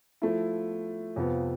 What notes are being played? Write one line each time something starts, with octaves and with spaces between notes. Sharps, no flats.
F3 A3 E4
F2 C3 F3 B3